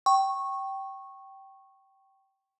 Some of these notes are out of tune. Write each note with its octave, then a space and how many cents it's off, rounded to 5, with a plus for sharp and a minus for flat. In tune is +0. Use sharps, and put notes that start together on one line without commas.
G5 -15 C#6 -15